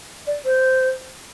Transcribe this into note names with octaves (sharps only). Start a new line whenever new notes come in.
D5
C5